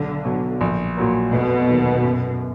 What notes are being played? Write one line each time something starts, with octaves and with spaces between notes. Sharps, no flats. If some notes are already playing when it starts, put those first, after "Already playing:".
Already playing: B1 D3
B2 F#3
A#1
A#2 F#3 A#3
F1 B2
D#2 D#3 F#3
F#2